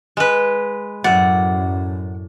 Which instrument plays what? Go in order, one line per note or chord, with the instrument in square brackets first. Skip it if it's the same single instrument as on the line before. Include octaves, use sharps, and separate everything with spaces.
[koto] G#3 B4
[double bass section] F#2 [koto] A2 D5 [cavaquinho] F#5